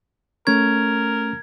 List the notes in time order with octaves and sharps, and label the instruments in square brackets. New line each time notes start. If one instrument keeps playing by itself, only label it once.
[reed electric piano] A3 C#4 C#6 [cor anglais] A#4 [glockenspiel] G#6